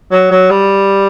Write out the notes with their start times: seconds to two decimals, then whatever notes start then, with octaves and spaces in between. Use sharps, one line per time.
0.11 F#3
0.31 F#3
0.50 G3